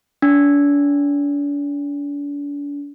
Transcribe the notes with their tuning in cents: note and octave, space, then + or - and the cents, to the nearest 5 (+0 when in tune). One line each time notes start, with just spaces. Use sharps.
D4 -40